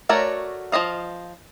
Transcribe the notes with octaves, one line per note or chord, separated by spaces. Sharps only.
A3 F#4 A#4 C#5 D5
F3 F#3 D#5 F5